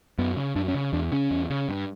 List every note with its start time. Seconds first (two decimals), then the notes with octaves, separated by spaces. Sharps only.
0.18 F#2 B3
0.37 C#3
0.56 F#2 D4
0.68 C#4
0.74 C#3
0.93 E2 D4
1.12 C#3 C#4
1.31 E2
1.50 C#3
1.69 G2